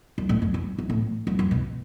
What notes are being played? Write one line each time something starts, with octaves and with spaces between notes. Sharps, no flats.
F#2
A2
F#2
F#2
F#2
A2
F#2
F#2
B2